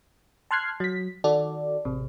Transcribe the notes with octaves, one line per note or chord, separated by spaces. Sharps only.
A5 C6 F6 F#6 G#6 C7
F#3 B6
D#3 F#4 A4 D5
A1 C3